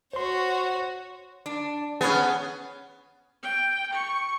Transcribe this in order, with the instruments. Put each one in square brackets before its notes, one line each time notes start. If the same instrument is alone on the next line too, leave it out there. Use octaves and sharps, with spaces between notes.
[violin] F#4 C#5 [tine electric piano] C5 C6
[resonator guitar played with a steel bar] D4
[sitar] B3 [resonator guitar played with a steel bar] C#4 G#4
[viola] G5
C#6